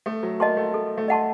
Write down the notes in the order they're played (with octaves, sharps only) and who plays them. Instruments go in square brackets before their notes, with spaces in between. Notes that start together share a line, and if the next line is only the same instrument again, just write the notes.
[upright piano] A3 [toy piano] A4
[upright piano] F#3
[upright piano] A#3 [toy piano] D#5 F#5 A5 C6
[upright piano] A3
[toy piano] A4
[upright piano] A3
[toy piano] D#5 F#5 A5 C6